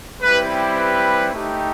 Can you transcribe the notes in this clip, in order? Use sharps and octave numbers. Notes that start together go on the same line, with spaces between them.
G3 C4 E4 G4 B4
B4
A3 D#4 G4